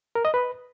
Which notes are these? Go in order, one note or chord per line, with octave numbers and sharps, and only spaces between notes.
A#4
D#5
B4